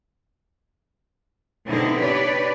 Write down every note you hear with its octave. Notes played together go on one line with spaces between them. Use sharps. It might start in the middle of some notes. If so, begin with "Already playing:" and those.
B2 D3 C4 D#4 E4 G#4
D4 G4 B4 C#5 D5